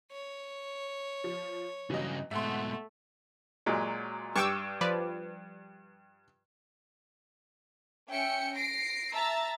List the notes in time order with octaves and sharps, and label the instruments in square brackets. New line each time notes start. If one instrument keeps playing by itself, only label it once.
[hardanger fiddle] C#5
[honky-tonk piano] F3
[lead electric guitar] G2 C#3 [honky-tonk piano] E3 F#3 D#5
[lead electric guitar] G#2 B2 [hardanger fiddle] A3 [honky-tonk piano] E5 F#5 C6
[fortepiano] A#2 F#3 G#3
[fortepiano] G2 G5 [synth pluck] C#6 D6 E6
[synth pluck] F3 B4 D5
[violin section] C#4 E5 G5 C#7
A#6 C7 D7
E5 A5 A#5 E6 A6